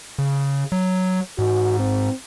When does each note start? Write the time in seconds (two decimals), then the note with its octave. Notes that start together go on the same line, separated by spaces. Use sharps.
0.19 C#3
0.72 F#3
1.39 G#2 F#4
1.79 C4